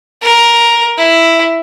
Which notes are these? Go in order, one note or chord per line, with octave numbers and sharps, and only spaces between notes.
A#4
E4